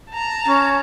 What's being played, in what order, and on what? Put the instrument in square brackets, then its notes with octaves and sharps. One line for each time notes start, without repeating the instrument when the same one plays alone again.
[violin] A5 A#5
[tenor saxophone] C#4